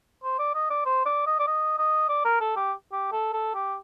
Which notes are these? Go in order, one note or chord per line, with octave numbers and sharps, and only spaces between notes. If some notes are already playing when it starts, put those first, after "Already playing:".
C5
D5
D#5
D5
C5
D5
D#5
D5
D#5
D#5
D5
A#4
A4
G4
G4
A4
A4
G4